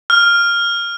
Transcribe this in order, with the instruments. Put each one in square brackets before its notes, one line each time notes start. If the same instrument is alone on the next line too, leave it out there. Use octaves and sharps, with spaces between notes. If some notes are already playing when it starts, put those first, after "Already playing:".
[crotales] F6